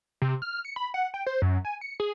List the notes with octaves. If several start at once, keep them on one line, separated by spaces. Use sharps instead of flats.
C3
F6
C#7
B5
F#5
G5
C5
F#2
G#5
C#7
G#4